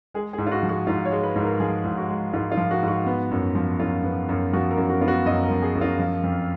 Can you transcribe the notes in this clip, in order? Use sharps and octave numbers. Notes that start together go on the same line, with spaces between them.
G#3 G#4
G#4
G#2
F4
F#4
F3
F#4
G#2 F4
C#5
G#3
B4
G#2
A#4
F3 G#4
G#2
F#4
G#3
G#2 F4
F4
F3
F#4
G#2
F#4
B3
F#2
F3
F#2 F4
B3
F#2
F3 F#4
A#4
F#2
F#4
B3 F4
F#4
F#2 D#5
A#4
F3
G#4
F#2
F4
F3
F2